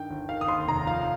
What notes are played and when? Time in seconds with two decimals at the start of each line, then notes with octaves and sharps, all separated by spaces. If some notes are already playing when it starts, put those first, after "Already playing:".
Already playing: G2 D#3 G5
0.10 G1
0.29 D#3 F5
0.41 D#6
0.48 D#2 C6
0.67 F1 A#5
0.87 F3 F5